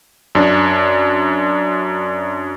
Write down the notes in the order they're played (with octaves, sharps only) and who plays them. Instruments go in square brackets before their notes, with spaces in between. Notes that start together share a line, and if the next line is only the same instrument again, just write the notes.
[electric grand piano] F#2 D4